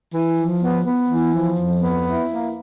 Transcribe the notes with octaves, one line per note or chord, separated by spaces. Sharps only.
E3
F3
B3
B3
E3
F3
F2
B3
E4
A#3